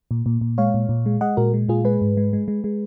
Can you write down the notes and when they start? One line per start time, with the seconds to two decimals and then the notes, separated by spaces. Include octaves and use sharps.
0.11 A#2
0.26 A#2
0.41 A#2
0.58 G#3 C#5 F5
0.74 A#2
0.89 A#2
1.06 G#3
1.21 G#3 D#5 F#5
1.37 A#2 F#4 A#4
1.54 G#3
1.68 A#2 F4 G#4
1.84 G#3 G#4 B4
2.01 G#2
2.17 G#3
2.33 G#3
2.48 G#3
2.64 G#3